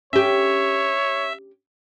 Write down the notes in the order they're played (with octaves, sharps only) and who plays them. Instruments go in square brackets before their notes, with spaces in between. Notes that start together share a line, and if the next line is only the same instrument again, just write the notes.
[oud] C#4 G4 [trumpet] C#5 [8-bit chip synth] E5